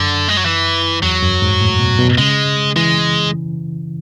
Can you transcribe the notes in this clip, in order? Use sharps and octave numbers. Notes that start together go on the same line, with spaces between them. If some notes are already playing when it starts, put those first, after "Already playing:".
Already playing: F#2 D3
G#3
F#3
E3
E2 F#3
F#2
G#2
A2
B2
B2
C#3 G#3
E3 G#3